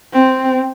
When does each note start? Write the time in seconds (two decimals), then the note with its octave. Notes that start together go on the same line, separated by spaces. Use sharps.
0.13 C4